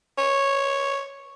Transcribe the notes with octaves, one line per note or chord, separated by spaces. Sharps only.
C#5